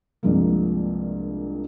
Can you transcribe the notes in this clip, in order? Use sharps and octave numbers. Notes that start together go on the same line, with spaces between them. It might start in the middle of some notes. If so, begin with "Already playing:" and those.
C2 G2 C3 F3 G#3 A#3